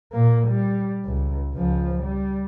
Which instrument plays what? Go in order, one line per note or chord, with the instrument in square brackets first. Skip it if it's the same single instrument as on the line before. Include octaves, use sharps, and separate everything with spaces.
[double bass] A#2 A#3
G3
C#2
C#2 F3
G3